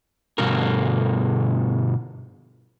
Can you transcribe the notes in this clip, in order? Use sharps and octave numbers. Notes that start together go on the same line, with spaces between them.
G2 B2 D3 A#4